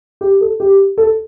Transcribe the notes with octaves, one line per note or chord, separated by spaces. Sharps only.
G4
A4
G4
A4